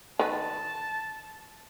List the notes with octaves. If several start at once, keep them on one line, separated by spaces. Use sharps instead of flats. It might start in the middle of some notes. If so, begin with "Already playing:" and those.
D#3 B4 A5